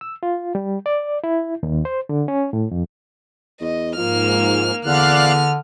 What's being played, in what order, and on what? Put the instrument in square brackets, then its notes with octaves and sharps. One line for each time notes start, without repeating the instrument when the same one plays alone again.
[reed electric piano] E6
F4
G3
D5
E4
D#2
C5
D3
C#4
A2
F2
[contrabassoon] E2 [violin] D#5
[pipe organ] G#2 [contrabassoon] F3 [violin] A#3 F6
[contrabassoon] E2 [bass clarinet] D3 [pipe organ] D5 F5 F#6 [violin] F6